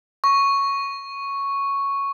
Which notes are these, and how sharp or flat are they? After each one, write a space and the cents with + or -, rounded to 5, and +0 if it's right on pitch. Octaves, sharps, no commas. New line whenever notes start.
C#6 +0